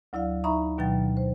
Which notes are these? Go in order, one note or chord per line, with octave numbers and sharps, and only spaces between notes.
D2 F#3 E4 D5 F5
D#4 E5 A#5 B5 C#6
D2 B2 D#3 F#3 G5 A6
C5